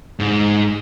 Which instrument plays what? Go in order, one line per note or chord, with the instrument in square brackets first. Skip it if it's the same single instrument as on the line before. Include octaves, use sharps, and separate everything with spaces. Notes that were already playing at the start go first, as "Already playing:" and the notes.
[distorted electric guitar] G#2